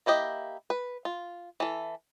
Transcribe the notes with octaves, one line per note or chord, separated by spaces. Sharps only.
A#3 E4 G4 D#5
B4
F4
E3 A4